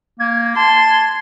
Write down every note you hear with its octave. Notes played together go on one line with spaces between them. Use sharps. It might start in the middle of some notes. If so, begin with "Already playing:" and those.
A#3 G#6
A5 C6